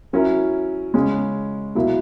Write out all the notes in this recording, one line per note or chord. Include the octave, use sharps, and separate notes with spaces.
F#3 C#4 E4 A#4
C#3 G#3 C#4
B2 F#3 A#3 E4